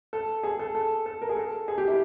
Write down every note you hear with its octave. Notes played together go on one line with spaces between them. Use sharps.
A4
G#4
A4
A4
A4
A#4
G#4
A4
G#4
G4
E4